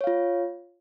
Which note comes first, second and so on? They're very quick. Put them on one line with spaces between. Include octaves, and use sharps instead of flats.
C#5 F5 F4